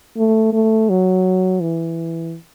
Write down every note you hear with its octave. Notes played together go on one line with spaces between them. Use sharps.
A3
A3
F#3
E3